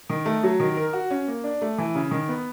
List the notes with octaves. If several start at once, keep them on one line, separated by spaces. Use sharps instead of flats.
D#3
A3
F#3
D#3
A#4
F#4
C#4
A#3
D4
A3
E3
C#3
D#3
B3